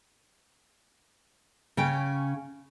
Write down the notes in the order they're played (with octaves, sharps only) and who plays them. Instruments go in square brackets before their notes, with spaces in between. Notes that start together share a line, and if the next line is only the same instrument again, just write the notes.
[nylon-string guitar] C#3 C#4 G5